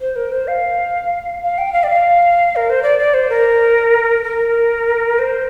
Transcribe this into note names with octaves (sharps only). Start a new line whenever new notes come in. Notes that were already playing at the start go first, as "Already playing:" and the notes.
C5
A#4
C5
F5
F5
G5
F5
D5
F5
A#4
C5
D5
D5
C5
A#4
A#4
C5